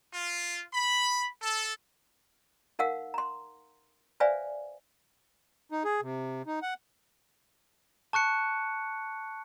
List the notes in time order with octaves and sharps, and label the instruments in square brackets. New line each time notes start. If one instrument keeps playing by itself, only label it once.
[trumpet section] F4
B5
A4
[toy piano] D#4 A#4 F5 F#5 E6
A#5 C6
B4 C5 D5 E5 F5 G#5
[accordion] D#4
G#4
C3
D#4
F#5
[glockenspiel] A5 C#6 F#6 C#7